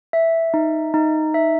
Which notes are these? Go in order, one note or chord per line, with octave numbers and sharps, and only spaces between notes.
E5
D#4
D#4
E5